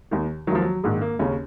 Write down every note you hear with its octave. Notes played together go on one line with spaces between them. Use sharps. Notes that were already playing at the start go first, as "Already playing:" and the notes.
D#2 D#3
D#2 D#3 F3 F#3
F#3
A#1 G#2 D#3 G#3
A#3
D#2 C#3 C#4